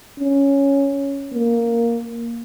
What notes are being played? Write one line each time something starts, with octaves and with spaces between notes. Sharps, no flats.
C#4
A#3